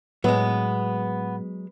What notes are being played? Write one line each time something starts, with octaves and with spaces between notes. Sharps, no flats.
A2 F#3 G#3 B3